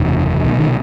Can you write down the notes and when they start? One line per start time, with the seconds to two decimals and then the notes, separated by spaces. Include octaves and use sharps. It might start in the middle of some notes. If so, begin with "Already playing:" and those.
Already playing: F#1 E2 C3
0.43 C2 B2 D#3
0.59 D#3